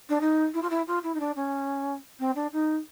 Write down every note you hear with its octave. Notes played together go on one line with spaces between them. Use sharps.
D4
D#4
E4
F4
E4
F4
E4
D#4
D4
C#4
C4
D4
D#4